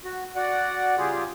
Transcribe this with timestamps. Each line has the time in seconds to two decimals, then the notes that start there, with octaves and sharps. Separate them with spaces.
0.04 F#4
0.36 F#4 D5 F#5
0.97 C#3 G3 F4 G4 G#4